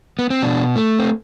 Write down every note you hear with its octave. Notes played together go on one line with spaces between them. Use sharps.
B3
C4
B2 D4
A3
C4